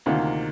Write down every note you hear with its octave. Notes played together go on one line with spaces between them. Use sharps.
D2 C3 D#3 A#3 F4